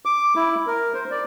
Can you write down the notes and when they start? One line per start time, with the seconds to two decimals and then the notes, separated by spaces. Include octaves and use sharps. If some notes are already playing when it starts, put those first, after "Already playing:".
0.05 D6
0.36 E4
0.67 A#4
0.94 C5
1.11 D5